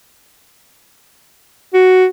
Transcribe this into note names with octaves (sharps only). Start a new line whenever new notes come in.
F#4